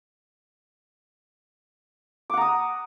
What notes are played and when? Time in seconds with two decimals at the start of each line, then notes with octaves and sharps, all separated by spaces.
2.30 D6
2.33 F#5
2.37 A#5
2.41 D#6